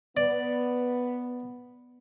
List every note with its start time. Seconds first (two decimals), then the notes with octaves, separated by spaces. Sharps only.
0.17 B3 D5